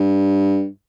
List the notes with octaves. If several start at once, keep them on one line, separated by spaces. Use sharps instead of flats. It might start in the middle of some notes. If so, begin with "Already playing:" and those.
Already playing: G2